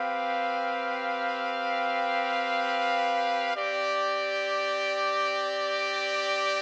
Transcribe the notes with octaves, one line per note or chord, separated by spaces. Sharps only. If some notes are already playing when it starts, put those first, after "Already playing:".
Already playing: C4 G4 B4 F5
C4 G4 D5